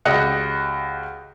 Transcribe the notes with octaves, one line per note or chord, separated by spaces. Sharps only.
C#2 F#4 G4 D#5 F#6 C#7